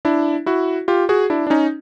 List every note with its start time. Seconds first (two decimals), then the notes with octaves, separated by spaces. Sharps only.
0.05 D4 E4
0.46 E4 F#4
0.88 F4 G4
1.09 F#4 G#4
1.30 D4 E4
1.47 D4
1.50 C#4 D#4